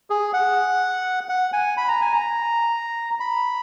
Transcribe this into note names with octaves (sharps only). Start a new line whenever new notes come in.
G#4
F#5
F#5
G#5
B5
A#5
G#5
A#5
B5